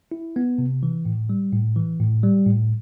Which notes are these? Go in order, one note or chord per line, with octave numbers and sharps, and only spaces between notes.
E4
B3
C3
E3
A2
G3
A2
E3
A2
G3
A2